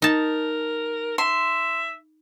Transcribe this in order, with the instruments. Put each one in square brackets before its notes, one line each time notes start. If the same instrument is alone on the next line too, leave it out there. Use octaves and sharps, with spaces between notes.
[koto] D#4 A5 [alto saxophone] A#4
[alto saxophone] E5 [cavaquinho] C6